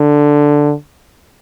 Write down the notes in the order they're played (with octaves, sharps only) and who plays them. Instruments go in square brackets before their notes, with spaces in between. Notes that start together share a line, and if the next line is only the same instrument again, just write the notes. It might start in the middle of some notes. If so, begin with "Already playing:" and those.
Already playing: [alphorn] D3